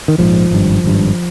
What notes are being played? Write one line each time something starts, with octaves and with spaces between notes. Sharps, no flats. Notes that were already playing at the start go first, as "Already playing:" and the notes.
D#3
A#1 G#2 F3
G#1 G2
G#1 G2